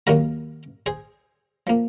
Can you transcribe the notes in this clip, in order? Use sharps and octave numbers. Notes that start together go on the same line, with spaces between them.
D#2 D#3 F#3 A#3 F#4 A#4
G#4 C5
F3 A#3